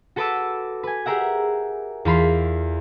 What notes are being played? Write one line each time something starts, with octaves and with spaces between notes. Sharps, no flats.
F#4 A4 B4 A5 D6 E6
B4 G#5
G4 G#4 A#4 E5 F#5
E2 F4 B5 C6